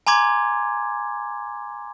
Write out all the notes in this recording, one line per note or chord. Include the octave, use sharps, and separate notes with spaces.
G#5 A#5 C6 D6 G#6